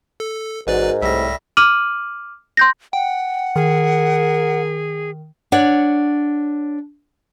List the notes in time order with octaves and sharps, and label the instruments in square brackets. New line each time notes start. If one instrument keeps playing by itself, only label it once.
[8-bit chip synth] A4
[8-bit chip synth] A1 B4 D5 [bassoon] G#2 [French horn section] F#4 A#4
[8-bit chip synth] C2 A#6 [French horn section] A2 C3 [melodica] G3 E5
[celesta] D6 F6 D#7 F#7
C6 G6 A#6
[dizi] F#5 [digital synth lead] G5
[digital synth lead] D#3 [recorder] G#4 [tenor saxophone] A#4
[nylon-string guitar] D4 C#5 F#5